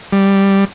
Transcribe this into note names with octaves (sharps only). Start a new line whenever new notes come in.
G3